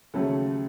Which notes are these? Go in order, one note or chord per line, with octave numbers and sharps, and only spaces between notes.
D#2 C#3 F#3 A3 A4